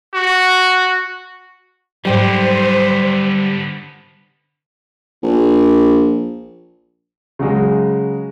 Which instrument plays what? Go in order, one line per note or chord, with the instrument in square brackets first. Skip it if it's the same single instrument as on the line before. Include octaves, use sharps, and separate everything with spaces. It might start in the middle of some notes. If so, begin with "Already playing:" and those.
[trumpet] F#4
[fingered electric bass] G#2 F#3 [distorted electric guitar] D3 B3 [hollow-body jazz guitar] G3 G4 [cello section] C5
[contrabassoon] A#1
[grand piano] C#3 F#3 G#3